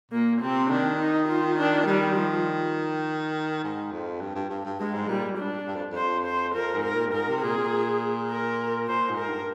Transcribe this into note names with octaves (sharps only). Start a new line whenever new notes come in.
A#2 A#3
C3 C4
D#3 D4
D#4
F4
D4
D#3 G3
F3
G#2
F2
G2
G2
G2
G2
G2 G#3
G#2
A#2 G3
D4
G2
F2
F2 C5
C5
F2 A#4
G#2
A#4
A#2
G2
G#2 A#4
C3
A#2 G#4
A#2
A#4
A#2 C5
G#2
A#4
G2